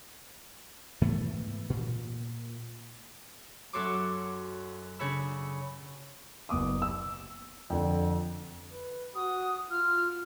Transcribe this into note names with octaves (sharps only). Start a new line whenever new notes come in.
G#2 E3 A3 B3
A#2
F#2 F#4 A4 C#5 C6 D6
C#3 D4 C#5 B5 E6
F#1 B3 D6 D#6
E6
F2 D3
B4
F#4 D#6
F4 F6